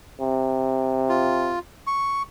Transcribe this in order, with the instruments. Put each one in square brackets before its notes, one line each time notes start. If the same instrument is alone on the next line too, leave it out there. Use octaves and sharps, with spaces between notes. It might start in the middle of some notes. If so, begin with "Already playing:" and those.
[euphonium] C3
[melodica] F4
C#6